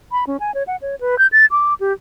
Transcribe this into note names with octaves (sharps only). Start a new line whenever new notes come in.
B5
C#4
G#5
C#5
F#5
C#5
B4
G6
A6
D6
G4